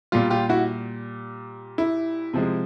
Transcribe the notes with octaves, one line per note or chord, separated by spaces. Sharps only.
A#2 G3 F4
F4 G4
E4 F#4
E4
C3 F3 G#3